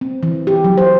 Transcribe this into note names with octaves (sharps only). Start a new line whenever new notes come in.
C4
E3
G4
F#3
C5